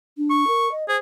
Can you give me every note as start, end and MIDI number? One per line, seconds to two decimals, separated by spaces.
0.18 0.44 62
0.30 0.69 85
0.48 0.71 70
0.72 0.84 75
0.88 0.97 68
0.88 0.99 72